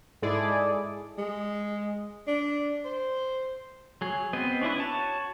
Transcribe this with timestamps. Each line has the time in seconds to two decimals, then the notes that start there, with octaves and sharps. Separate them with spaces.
0.22 G#2 G#3 E4 G#4 A4 D5
1.18 G#3
2.27 D4
2.85 C5
4.01 F#3 G#4
4.33 B3 C4 C5 D#5
4.62 C#4 D4 E4 B4
4.80 F#4 C#5 A5